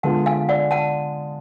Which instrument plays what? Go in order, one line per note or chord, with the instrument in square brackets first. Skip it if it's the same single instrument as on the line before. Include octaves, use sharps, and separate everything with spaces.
[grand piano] D3 G#3 B3 F4 [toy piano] F#5 A5
[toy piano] F5 G#5
D5 F#5
F#5 A5